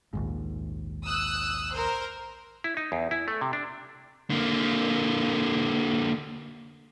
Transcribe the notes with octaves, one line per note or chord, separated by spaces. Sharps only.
A#1 D#2 G#2
D#6 E6 F#6
A#4 C5
E4
D#4
E2
E4
A3
C3
D4
D3 A#3